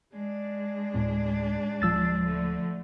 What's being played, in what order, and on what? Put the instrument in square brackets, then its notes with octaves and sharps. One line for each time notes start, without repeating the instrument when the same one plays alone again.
[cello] G#3 D4
[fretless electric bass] D2 A2 C4
[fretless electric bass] D1 [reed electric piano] F3 E6 A6
[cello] D3 A3